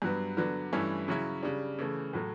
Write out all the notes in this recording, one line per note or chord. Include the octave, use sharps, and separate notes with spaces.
G2 F#3 B3
D3 F#3 B3
G2 E3 A3 C#4 E4
C#3 F#3 C#4 E4
C#3 G3 D4
C#3 E3 A3
A2 F#3 A3